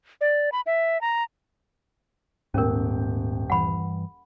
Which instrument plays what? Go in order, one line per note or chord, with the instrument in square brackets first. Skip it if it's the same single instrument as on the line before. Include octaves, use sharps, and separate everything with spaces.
[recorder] D5
B5
E5
A#5
[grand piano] D#1 A3 G5 [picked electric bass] G#2 B3 [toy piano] C#4 A#4
[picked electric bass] G2 E3 [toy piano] F#5 B5